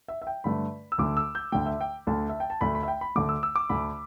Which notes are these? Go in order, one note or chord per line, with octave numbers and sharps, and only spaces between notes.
E5
E5
G5
G2 D3 A3 B5
E6
D2 D3 A3 D6
E6
G6
D2 D3 A3 G5
E5
G5
D2 D3 A3 A5
E5
G5
A5
D2 D3 A3 B5
B5
E5
G5
B5
D2 D3 A3 D6
E6
E6
D6
D2 D3 A3 B5